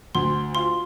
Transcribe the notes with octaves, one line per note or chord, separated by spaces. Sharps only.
D2 C6
F4 C6